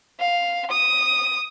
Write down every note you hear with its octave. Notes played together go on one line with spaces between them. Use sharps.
F5
D#6